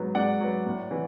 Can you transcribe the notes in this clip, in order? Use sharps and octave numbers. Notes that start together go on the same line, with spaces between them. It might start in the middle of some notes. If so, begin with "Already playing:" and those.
Already playing: G#2 F#3 B3
G#2 D5 F#5
F#3 B3
A2
E3